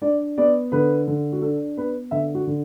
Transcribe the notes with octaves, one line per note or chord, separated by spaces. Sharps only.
D4 D5
B3 D5
D3 B4
D3
F#4
D4 A4
B3 B4
D3 E5
F#4
D3